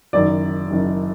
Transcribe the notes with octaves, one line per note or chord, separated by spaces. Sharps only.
F#1 F#2 D#3 D5
F#1 F#2 D#3